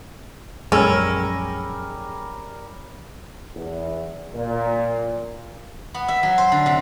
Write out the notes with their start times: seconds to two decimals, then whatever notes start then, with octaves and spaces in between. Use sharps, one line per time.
0.72 A#1 F#2 G3 G#3 C#4 G#4 A#4 E6
3.55 E2
4.34 A#2
5.94 B3
6.08 E5
6.23 F#3
6.38 C5
6.52 D3
6.66 C3